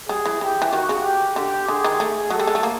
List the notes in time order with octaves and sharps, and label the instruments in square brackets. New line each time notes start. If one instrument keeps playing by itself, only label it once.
[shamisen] G3 [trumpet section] G#4
[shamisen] E3
[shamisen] E3 [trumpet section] G4
[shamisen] E3
[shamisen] D#3 [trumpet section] F#4
[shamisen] C#3
[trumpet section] G4
[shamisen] D3 [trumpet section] G4
[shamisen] D3 [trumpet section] G#4
[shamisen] D#3
A3
[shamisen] F#3 [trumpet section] A4
[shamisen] G3
G#3
A3
A#3